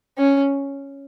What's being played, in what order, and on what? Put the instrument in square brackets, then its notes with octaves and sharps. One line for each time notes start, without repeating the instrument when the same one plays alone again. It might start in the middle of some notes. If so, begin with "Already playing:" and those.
[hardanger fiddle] C#4